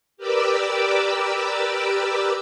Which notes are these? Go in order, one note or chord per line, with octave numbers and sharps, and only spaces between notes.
G4 A#4 B4 D5 D6 E6